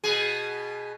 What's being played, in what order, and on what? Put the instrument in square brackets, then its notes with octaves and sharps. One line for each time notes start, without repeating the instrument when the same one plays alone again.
[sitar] B2 B3 G#4